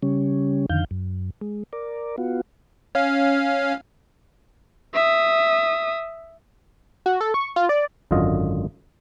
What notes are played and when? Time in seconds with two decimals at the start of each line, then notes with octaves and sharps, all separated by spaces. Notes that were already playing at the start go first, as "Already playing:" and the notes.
0.02 C#3 G3 C#4
0.69 F2 D3 D#3 F5 G6
0.91 F#2
1.41 G#3
1.73 A#4 D5
2.18 B3 F4 F#4
2.95 C#4 F5
4.94 E5 D#6
7.06 F#4
7.21 A4
7.34 C#6
7.56 F4
7.69 D5
8.11 G#1 F#2 D3 F4 D#5